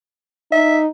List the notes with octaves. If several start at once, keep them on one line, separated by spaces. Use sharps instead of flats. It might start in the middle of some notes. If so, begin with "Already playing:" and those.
D#4 E5